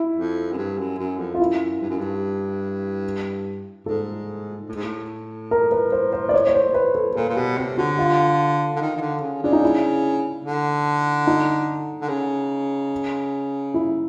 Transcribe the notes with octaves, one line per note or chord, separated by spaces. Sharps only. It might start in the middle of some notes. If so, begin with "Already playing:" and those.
Already playing: E4
F2
F#2
G2
F#2
F#2
F2
F4
F#2 E4
G2
F#2
G2
G#2 A4
A2
G#2
A2
A#4
B4
C5
C5
D5
C#5
C#5
C5
B4
A4
A#2 A4
A#2
B2 G4
C3 G4
D3 F#4
F4
D3
D#3
D#3
D3
C#3
C#3 D4
D#4
E4
D3
D#4
D3
C#3
E4